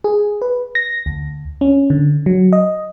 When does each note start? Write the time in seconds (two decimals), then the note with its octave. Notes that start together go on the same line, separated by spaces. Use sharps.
0.04 G#4
0.42 B4
0.75 A#6
1.06 D2
1.61 C#4
1.90 D3
2.26 F#3
2.53 D#5